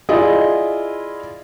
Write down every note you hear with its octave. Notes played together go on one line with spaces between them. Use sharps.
E4 F4 G#4 D5 D#5